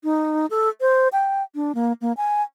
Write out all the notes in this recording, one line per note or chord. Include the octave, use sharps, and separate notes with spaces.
D#4
A4
C5
G5
D4
A#3
A#3
G#5